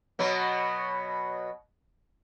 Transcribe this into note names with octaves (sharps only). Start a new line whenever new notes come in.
B2 F#3 B3